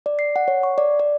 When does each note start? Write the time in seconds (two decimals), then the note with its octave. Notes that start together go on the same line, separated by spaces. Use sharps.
0.06 D5
0.19 C7
0.36 F#5
0.48 C#5
0.63 C#6
0.78 D5
0.99 D5